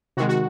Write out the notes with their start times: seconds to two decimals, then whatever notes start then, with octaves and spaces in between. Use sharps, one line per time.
0.17 C3 D#3 G#3 F#4
0.29 F#4